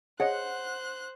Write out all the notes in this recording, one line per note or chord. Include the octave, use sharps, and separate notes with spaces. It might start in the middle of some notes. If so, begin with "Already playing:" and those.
G#4 C5 C#5 D#5 F#5 F#6